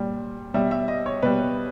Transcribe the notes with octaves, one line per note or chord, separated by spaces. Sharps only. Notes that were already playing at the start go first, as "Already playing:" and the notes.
Already playing: A#2 G3
B2 G3 E5
E5
D#5
C#5
B2 G3 B4